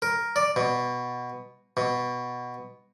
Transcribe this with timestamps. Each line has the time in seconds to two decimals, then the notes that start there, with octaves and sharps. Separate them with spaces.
0.02 A#4
0.36 D5
0.56 B2
1.77 B2